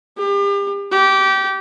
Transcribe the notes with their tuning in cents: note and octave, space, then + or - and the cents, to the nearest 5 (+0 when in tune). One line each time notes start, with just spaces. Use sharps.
G4 +35
G4 -20